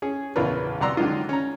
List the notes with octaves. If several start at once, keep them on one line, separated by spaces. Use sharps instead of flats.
C#4 G#4
A#1 E2 C#3 F4 A#4 B4
C2 D5 F#5 A#5 C6 E6
D3 D#3 F#3 G#3 D#4 F4
C#4 A#5